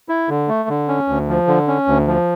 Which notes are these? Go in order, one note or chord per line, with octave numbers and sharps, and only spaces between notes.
E4
D3
A3
D3
C#4
D2
F3
D3
C#4
D2
F3